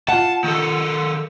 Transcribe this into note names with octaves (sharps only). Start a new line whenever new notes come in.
F4 F#5 A5
D#3 A4